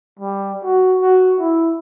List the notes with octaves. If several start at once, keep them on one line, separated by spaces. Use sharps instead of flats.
G3
F#4
F#4
E4